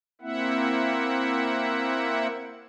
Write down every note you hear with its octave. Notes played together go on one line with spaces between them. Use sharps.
A#3 C4 E4 E5 F#5